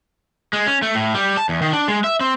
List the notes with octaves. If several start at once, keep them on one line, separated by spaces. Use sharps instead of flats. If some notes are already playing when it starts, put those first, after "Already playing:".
G#3
C#4
A3
A2
G3
A5
E2
D#3
D4
G#3
E5
C4